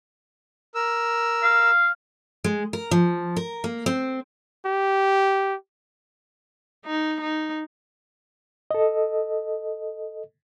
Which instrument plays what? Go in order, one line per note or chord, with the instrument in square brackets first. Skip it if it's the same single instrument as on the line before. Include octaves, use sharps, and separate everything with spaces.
[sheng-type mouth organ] A#4 E6
[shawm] F5
[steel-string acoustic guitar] G#3
A#4
F3
A#4
A#3
C4
[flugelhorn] G4
[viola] D#4
D#4
[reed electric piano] A4 D#5